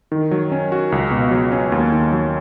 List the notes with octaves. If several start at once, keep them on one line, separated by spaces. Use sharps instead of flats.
D#3
F#3
C#4
F#4
C#2
B2
F#3
C#4
D#2
D#3
F#3